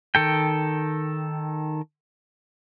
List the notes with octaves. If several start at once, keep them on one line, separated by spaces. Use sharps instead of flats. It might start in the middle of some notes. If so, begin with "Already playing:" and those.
D#3 A4 G5